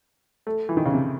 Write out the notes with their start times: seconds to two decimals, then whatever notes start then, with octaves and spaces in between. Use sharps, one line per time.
0.47 A3
0.69 E3
0.77 D#3
0.85 C#3
0.94 C3